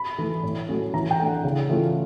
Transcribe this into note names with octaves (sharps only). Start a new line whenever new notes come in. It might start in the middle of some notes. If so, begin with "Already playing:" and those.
Already playing: B5
E3 A3
A2
F#3 A3 C#4
E3 A#5
G5
A3 D4
F#5
C#3
E3 A3 C#4 F4